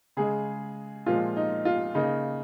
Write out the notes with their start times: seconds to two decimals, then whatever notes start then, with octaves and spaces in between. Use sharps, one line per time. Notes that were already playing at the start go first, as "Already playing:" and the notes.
0.17 C#3 G#3 G#4
1.06 A#2 F3 G#3 F4
1.36 D#4
1.65 F4
1.95 C#3 A#3 D#4